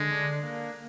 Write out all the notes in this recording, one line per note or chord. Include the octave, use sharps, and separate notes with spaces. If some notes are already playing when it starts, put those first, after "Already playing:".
Already playing: D3 G#3
D4
A#3